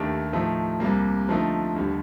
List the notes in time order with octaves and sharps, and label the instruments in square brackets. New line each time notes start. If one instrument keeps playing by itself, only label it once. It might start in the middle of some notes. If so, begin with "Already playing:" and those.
Already playing: [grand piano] D#2 D#3 A3 D4 G4
A2 F3 A3 D#4
C2 C3 G3 A#3
D3 F3 A3 D#4
D#2 D3 G3